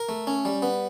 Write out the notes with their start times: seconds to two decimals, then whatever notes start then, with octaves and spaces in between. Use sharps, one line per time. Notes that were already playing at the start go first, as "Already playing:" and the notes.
Already playing: A#4
0.09 A3
0.27 C#4
0.45 G3
0.62 B3